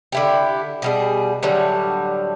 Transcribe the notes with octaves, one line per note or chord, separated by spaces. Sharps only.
D3 E4 G4
B2 G3 G#4
A2 D3 F#3 G3